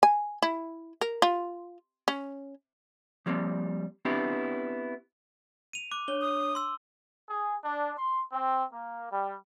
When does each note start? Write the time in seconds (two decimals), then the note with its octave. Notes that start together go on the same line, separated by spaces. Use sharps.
0.03 G#5
0.42 E4
1.01 A#4
1.22 F4
2.08 C#4
3.26 F3 G3 A#3 C4
4.05 B3 C4 D4 E4 G4
5.73 D#7 F7
5.92 D6 F#6
6.08 D4 C#5 G7
6.21 D#6
6.55 C6 E6
7.28 G#4
7.63 D4
7.96 C6
8.31 C4
8.71 A#3
9.12 G3